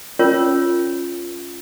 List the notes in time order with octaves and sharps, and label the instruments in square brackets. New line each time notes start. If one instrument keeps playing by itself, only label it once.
[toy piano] C#4 F4 A#4 C#5